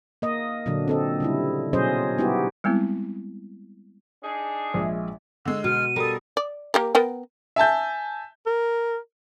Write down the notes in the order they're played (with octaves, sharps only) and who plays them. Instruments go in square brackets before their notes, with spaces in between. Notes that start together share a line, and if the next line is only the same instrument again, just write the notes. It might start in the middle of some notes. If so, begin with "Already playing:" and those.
[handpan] A#3 D#5
A#2 D3 F#3 D4
C4 A4 D#5
C#3 G3 E4
B2 F#3 C#4 G#4 C5 D#5
G3 B3 D#4 E4 F#4 G4
[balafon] G3 G#3 B3 C4 E4
[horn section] D4 D#4 G#4
[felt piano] A#1 G#3 E5
[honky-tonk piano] D3 G#3 [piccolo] E6
[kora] B2 [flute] F6 [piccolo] D#7
[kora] G3 [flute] A4 [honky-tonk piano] A#4 D#6
[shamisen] D5
A#3 G4 A#4
B3 A#4 G5
[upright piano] E5 G#5 A5 G6
[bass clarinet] A#4